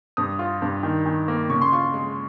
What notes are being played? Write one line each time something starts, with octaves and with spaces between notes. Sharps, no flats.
G2 D#6
F4
G2
D#3
D#3
A#3
C#3 C#6
C6
F4 C#6
G#3